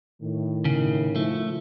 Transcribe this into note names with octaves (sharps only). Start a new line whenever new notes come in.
A2 D#3
C#3
F3 A3 E4